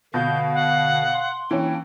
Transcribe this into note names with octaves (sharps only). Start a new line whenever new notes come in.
B2 D3 F5 G6
F#5
C6
E3 A#3 C#4 D4 G5